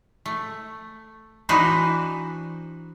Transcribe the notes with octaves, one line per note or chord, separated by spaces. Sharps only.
A3
E3 D4 D#4 F#4 B4 C5